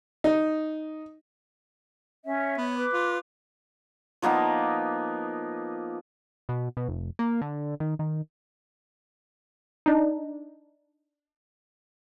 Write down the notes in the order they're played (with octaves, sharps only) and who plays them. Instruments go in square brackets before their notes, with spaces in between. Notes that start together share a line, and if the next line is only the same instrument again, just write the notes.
[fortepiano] D#4
[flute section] C#4 [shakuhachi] E5
[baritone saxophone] B3 [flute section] C#5
[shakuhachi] B4 [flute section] D6
[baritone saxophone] F4
[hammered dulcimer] F3 A#3 B3 D#4
[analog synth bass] B2
B2
F1
A#3
D3
D#3
D#3
[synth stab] D4 D#4